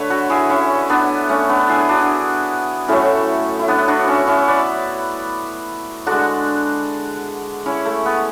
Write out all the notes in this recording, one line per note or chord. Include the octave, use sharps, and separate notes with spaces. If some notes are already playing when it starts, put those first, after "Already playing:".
Already playing: D3 A3 B4 C#5
F#4 A4
E4 G#4
C#4 E4
B3 D4
A3 C#4
B3 D4
E4 G#4
G#4
D4 F#4
A2 F#3 A3 C#4 E4
E4
B3 D4
D4 F#4
C#4 E4
C#4 E4
B4 D5
D3 G#3 D4 F#4
C#4 E4
A3
B3